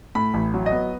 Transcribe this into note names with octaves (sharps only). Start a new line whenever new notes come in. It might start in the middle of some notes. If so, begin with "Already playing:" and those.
A2 B5
A1
F#3
D#5
B3